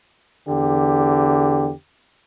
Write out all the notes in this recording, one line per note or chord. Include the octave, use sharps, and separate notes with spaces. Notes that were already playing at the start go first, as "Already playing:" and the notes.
E2 D3 G4